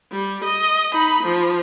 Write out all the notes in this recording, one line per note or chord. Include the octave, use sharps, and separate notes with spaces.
G3
D#5
D#4 B5
F3